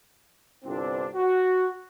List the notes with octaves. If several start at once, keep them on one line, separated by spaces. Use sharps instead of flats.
G1 C2 C4 D4
F#4